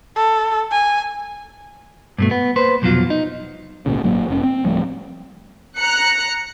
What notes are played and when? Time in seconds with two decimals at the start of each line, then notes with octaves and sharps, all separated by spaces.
0.16 A4
0.71 G#5
2.18 G2 B2 A3
2.31 B3
2.56 A#3 B4 C5
2.82 C2 F2 B2 F#3 F4
3.10 D#4
3.86 G#1 C#2 A#2 C#3
4.03 G#1 A#2 F#3 A#3
4.28 F1 C#4
4.43 C4
4.65 D1 F3 G3 A3
5.78 A#5 F#6 C#7